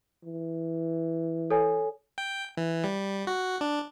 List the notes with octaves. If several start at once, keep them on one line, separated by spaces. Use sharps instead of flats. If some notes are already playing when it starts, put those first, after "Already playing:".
E3
A4 C#5 G#5
G5
E3
G3
F#4
D4